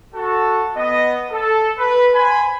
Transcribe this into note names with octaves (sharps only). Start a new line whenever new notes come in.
F#4 A4
B3 D#5
A4
B4
C5 G#5 B5